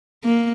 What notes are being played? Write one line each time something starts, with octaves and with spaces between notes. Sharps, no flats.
A#3